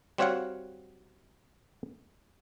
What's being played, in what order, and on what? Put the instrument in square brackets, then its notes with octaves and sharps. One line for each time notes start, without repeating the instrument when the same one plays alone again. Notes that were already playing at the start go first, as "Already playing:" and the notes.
[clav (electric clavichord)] G3 C4 F#4 C#5 F5 F#5